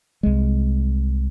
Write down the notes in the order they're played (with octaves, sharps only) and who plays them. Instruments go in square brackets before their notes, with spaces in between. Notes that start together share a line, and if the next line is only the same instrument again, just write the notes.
[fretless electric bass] C2 G#3